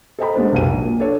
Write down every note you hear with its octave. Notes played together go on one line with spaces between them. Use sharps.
A4 C5 D#5 G5 A#5 B5
G#3 B3 D4 C5
F1 B1 D#7
A#1
A#2
D4 A4 C#5